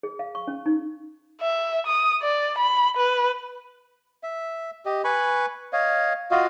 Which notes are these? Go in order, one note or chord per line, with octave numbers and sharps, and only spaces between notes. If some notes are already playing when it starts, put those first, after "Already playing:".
G#4
F5
C#6
C#4
D#4
E5
D#6
D5
B5
B4
E5
G4 D#5
B4 G#5 B5 C#6
C#5 D#5 F5
F4 F#4 D#5 F5